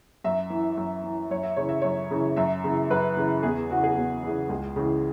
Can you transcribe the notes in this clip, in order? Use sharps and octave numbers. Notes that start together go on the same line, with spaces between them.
F#2 E5
E3
F#2
E3
F#2 C#5
E5
C#3 E3 C#5
E5
F#2 C#5
C#3 E3
F#2 E5
C#3 E3
F#2 B4
C#3 E3
E2 G#4
C#3 E3 F#4
G#4
E2 F#4
C#3 E3
C#2 G#4
C#3 E3